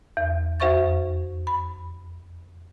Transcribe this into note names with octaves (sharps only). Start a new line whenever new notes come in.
E2
F2 F#4 C5 E5 C#6 A6
B5